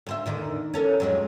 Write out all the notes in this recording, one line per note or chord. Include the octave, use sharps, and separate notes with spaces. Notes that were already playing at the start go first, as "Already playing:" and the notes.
D2 C5 E5
E2 D3 D#3
C#4 A4 A#4
F2 F#3 G#3